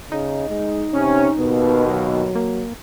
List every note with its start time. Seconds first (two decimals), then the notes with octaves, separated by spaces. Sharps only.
0.12 C#3 D#4
0.50 G#3
0.93 C3 C#4
1.38 D#2 B2 B3
1.87 F#3
2.35 A#3